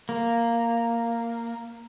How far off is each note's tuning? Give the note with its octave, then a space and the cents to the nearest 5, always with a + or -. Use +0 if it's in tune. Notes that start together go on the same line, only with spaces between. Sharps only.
A#3 -5